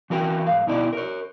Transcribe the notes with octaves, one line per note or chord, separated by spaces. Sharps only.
E3 F#4 A#4 G5
G#2 F5
B2 D#4 E4 D5
A#4 C#5